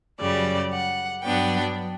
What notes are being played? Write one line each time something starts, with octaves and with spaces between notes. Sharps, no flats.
F#2 C#3 G3 D5
F#5
G2 F#3 B3 D4 G5